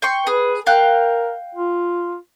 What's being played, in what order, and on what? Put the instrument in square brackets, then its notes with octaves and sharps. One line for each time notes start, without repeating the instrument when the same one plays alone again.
[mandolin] G5 C6 C#6
[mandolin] G#4 [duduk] B4
[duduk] A#4 [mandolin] F5 G5 F#6
[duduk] F4